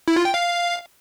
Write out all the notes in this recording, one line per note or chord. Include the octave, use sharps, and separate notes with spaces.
E4
F4
G5
F5